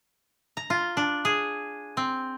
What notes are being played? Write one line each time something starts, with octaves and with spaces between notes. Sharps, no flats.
A#5
F4
D4
G#4
C4